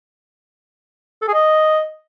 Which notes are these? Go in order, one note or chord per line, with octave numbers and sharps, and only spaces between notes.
A4
G#4
D#5